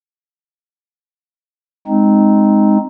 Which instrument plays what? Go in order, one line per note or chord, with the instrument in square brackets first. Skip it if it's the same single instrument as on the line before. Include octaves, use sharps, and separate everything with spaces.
[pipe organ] G#3 C4 D#4